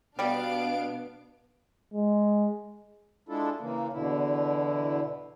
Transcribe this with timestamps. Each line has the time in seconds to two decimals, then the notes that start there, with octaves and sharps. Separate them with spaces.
0.19 B2 G3 B3 D4 D5 F5 D7
1.94 G#3
3.29 G#3 D4 E4 F4 A4
3.60 C#3 E3 A#3
3.93 E2 B2 D3 E4